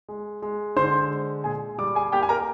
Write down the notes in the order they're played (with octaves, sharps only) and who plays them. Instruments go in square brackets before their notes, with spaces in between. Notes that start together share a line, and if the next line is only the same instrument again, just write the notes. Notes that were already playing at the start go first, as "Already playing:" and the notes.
[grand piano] G#3
G#3
D3 C5 C6
G#3
A#2 G#4 G#5
G3 D5 D6
G#4 G#5
A#3 G4 G5
G#5
A#4 A#5